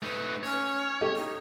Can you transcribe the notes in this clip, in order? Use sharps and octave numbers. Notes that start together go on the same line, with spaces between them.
A3 D#4 B4
C#4 C#5
G4 A4 D#5
D#4